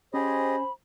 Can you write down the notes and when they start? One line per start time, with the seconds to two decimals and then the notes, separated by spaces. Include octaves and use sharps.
0.14 C#4 G4 G#4 C5 D#5 G#5 B5